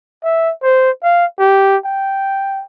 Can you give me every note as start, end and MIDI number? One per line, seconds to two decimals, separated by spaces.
0.23 0.52 76
0.63 0.91 72
1.03 1.25 77
1.39 1.77 67
1.85 2.63 79